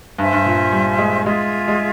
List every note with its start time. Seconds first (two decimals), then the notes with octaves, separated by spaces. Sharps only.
0.18 G2 C5 E5 G#5
0.33 G2
0.46 A#2
0.72 G3
0.98 G#3
1.25 G#3 F4 G#4 E5
1.68 G#3